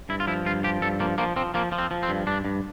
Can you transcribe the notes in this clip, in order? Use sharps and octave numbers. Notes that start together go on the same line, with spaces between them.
G2 E4
F4
F3 E4
G2 F4
F3 G4
G2 A4
F3 A#3
F3 A#3
F3 C4
F3 A#3
F3
C4
F3
C4
G2
G2 D4
G2